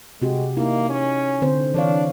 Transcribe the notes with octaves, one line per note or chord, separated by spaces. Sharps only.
C3 G#3 F#4 G4
A#3 D#4 E4
C#4
D3 C4 C5
E3 D4 C#5 F5